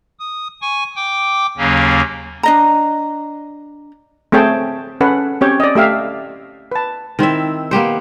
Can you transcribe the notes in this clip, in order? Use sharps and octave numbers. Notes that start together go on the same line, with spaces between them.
D#6
G#5 C#6
G5 D6
D#2 C#3 F#3 A#3 C#4
D4 D#5 A#5
A3 C4 G#4 C#5 G5 A5
C#4 A4 B4 F#5
C4 C#4 G4 C#5 G5
D5 D#5
A3 G4 E5 F5
B4 A5
D#3 C4 E4 E5
A#3 B3 G4 C5